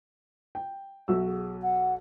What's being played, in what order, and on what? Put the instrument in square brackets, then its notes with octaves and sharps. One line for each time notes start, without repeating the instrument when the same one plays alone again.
[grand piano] G5
[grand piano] B1 F#4 E6 [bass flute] E5
[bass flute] G#4
F#5